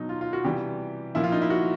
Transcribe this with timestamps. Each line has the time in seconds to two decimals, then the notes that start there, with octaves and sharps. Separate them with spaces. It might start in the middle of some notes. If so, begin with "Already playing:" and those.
Already playing: B2 F#3 D#4
0.09 F4
0.21 F4
0.33 F#4
0.44 C3 E3 G3 G4
1.15 A#2 F3 E4
1.24 F4
1.32 D#4
1.42 E4
1.50 F#4